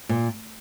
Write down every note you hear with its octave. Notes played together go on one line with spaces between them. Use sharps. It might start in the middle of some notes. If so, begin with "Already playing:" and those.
A#2